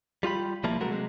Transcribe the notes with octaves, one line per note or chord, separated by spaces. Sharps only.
G3 F4 G4 B5
B1 F3 G3 A#3 E4 A5
C3 F#3 G#3 A3 F#4 A#4
C3 F#3 G#3